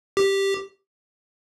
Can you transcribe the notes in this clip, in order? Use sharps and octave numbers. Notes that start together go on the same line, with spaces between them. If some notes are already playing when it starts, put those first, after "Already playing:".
G4